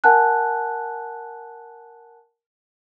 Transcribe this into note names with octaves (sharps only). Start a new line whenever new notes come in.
A#4 F#5 G#5 A5 F#6